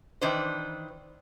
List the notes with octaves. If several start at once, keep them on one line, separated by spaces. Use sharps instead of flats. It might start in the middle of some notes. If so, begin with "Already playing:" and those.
D#3 E3 D4 B4 C5